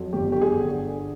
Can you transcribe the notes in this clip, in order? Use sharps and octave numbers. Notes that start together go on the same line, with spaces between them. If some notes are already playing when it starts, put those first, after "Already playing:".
Already playing: F2 F#3
G1 G4
G4
G#4
D3